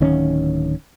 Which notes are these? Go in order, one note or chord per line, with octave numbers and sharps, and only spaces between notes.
D1 D#3 C#4